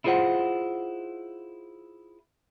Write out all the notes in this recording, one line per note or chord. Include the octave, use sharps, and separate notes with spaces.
E4 F4 G#4 C5 C#5 F#5